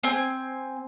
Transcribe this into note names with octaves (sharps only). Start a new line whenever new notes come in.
C4 G#5